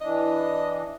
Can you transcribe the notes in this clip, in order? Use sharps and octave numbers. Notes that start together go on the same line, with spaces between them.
E3 D4 D#5